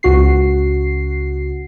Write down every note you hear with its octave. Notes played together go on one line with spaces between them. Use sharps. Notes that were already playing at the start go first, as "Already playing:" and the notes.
C#2 F#4 C7